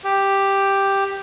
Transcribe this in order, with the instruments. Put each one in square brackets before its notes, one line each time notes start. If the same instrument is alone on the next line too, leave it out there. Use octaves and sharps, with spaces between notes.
[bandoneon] G4